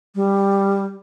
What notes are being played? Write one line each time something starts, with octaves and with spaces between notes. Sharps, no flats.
G3